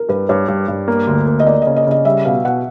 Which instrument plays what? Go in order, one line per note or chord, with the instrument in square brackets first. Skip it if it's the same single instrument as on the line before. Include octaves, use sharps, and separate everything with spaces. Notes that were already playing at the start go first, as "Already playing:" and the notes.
Already playing: [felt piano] A#4
[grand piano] G2 [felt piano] B4
[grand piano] G2 [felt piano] C#5
[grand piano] G2
G2
A#3
D2
A#3
[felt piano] D#5
[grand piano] A#3 [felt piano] D5
[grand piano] C#3 [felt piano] D#5
[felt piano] D#5
[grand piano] C#3 [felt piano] D#5
[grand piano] G3 [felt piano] E5
[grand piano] B2 [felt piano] F5
[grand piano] B2 [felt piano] F#5